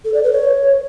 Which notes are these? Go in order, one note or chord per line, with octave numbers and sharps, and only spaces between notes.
A4
D5
B4
C#5